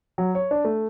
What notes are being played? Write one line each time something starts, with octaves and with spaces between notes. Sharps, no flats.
F#3
C#5
D4
A3